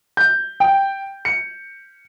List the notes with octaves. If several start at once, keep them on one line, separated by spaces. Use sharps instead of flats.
G6
G5
C#7